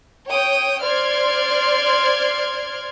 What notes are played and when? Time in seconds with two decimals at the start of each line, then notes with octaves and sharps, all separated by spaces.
0.26 C#5 G5 D#6
0.82 C5 D5 C6 F6 G#6